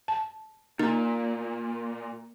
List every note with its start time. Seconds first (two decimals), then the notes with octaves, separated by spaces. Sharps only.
0.08 A5
0.79 A#2 A#3 D#4